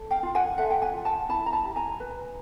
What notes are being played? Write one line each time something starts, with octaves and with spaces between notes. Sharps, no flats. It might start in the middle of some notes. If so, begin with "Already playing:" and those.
Already playing: A4
F5 G5
F4
F#5 G#5
A4 E5 F#5
G5
F#5 G#5
F4
G5 A5
E4 A5 B5
A#5
A5 B5
G4
G#5 A#5
B4